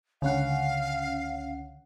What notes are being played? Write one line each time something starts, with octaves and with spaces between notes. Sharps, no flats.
C#2 D3 C#4 F5 F#5